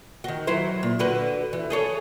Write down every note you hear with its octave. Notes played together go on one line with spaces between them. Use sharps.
D#3 F#4
F#3 E4 C5
A#2
D3 F#4 B4
E3
G#4 A4 C#5